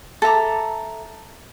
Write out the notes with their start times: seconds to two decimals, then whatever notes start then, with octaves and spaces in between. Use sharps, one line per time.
0.22 A4 E5 A#5 D6